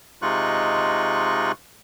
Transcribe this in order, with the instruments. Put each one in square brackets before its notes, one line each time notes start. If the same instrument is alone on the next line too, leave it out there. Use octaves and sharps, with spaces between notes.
[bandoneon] C3 G#3 D#4 F4 C#6 F#6